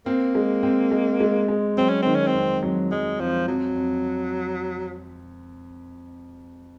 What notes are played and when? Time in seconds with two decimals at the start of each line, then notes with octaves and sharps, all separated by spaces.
0.06 A#3 C4
0.35 G#3
0.63 C4
0.91 G#3
1.20 G#3
1.48 G#3
1.77 F#3 C4
1.89 C#4
2.02 D#3 C4
2.15 C#4
2.27 C4
2.34 F2
2.63 F#3
2.91 F#3 G#3
3.19 F2 F3
3.48 F2 F#3
3.76 F2